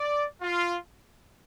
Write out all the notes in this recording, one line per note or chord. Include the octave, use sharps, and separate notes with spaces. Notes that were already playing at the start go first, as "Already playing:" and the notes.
Already playing: D5
F4